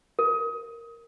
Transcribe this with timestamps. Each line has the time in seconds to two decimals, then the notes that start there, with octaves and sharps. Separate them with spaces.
0.19 A#4